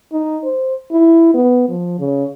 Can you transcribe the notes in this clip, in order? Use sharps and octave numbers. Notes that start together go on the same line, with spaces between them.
D#4
C5
E4
B3
F3
C#3